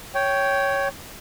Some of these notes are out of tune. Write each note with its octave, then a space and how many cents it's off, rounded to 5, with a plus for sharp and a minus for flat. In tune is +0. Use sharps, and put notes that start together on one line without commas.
C#5 +5 G5 -10